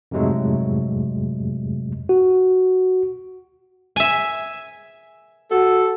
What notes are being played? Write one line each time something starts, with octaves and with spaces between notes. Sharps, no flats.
F2 G#2 C3 F#3 G#3 A3
F#4
E5 G#5
F#4 A4